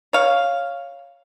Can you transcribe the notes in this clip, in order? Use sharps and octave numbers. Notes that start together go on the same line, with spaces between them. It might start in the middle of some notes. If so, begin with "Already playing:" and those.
C#5 F5